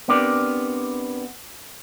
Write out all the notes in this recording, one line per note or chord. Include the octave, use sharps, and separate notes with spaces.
B3 C4 D4 G4 A#4 D5